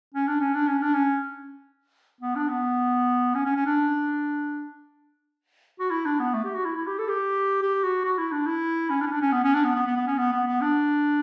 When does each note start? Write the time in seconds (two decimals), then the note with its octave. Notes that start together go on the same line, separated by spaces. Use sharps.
0.14 C#4
0.27 D4
0.41 C#4
0.55 D4
0.67 C#4
0.82 D4
0.94 C#4
2.21 B3
2.35 D4
2.49 B3
3.35 C#4
3.46 C#4
3.56 C#4
3.66 D4
5.80 F#4
5.91 E4
6.06 D4
6.20 B3
6.34 A3
6.45 G4
6.55 F#4
6.66 E4
6.77 E4
6.87 G4
6.98 A4
7.09 G4
7.62 G4
7.84 F#4
8.05 F#4
8.18 E4
8.32 D4
8.46 E4
8.90 C#4
9.01 D4
9.07 C#4
9.12 D4
9.21 C#4
9.32 B3
9.44 C#4
9.54 D4
9.64 B3
9.75 B3
9.86 B3
9.97 B3
10.07 C#4
10.18 B3
10.32 B3
10.47 B3
10.61 D4